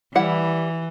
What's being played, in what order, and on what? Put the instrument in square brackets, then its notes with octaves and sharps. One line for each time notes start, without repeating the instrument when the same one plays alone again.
[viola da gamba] E3 [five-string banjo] G3 E4 F#5